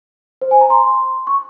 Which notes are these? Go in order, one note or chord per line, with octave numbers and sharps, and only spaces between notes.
C5
G#5
A#5
C6
C#6